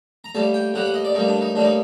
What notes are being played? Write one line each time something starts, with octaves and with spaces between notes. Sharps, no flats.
A#5
A2 G3 A#3 A5
G5
A2 G3 A#3 F#5
F#5
D#5
D5
A2 G3 A#3 D#4
D4
D#4
A2 G3 A#3 D4
D#4